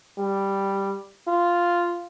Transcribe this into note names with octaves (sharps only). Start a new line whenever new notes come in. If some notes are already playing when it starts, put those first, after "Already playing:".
G3
F4